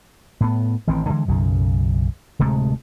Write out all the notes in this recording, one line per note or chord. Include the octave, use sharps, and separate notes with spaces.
A2 B3
A1 D#3 E3 C4
D3 E3 G#3
B1 F#2 C#3
D1 C3 G#3 A3